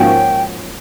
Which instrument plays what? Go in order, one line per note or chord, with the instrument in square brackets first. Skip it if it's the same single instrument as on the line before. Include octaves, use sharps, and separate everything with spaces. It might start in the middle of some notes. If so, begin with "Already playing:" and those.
Already playing: [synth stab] G#2 F3 A#3 C#4 F#4 [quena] G5